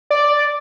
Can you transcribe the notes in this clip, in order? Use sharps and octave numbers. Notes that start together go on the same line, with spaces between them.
D5